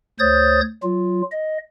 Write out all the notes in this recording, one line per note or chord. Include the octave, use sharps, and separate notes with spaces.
D2 C5 C#5 D#6 G6 A6
F#3 F4
D#5